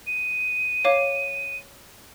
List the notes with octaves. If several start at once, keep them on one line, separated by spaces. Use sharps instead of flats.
D#7
C#5 F5 D6